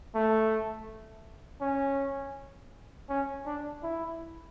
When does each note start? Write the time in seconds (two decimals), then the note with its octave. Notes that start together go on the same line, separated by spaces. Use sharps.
0.15 A3
1.61 C#4
3.09 C#4
3.46 D4
3.83 E4